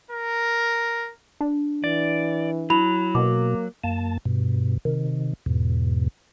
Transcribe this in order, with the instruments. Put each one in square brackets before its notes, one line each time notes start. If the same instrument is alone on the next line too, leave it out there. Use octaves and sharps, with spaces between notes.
[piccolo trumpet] A#4
[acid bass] D4
[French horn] E3 [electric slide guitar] D5
[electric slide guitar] F#3 [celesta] E4 B5 F7
[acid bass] B2 [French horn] A#3 [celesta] D6
[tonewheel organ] F#2 A#3 A5
G2 B2
C3 D#3
E2 G#2 B2